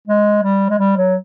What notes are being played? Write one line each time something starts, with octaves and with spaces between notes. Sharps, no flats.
G#3
G3
G#3
G3
F#3